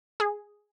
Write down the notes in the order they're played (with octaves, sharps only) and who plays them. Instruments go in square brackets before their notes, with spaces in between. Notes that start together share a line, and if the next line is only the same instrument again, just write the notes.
[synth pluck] G#4